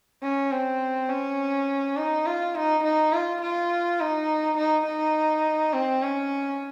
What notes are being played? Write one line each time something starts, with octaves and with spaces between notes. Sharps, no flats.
C#4
C4
C#4
D#4
F4
D#4
D#4
F4
F4
D#4
D#4
D#4
C4
C#4